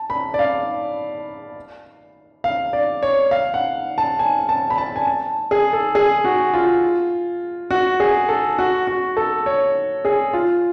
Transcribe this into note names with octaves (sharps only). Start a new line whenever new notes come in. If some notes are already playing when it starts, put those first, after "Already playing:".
Already playing: A5
B5
D5
F5
F5
D5
C#5
F5
F#5
A5
G#5
A5
B5
A5
G#5
A5
G#4
A4
G#4
F#4
F4
F#4
G#4
A4
F#4
F#4
A4
C#5
G#4
F4